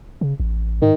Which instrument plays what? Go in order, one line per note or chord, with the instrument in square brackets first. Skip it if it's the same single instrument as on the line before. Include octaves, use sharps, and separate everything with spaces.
[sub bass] C#3
A1
[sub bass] G#2 [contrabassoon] D#3